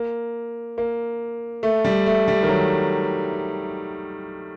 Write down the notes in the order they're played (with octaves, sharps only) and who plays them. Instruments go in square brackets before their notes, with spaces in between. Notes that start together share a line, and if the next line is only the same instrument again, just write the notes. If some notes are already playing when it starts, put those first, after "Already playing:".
Already playing: [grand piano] A#3
A#3
A3
G3
A3
G3
D#3
F#3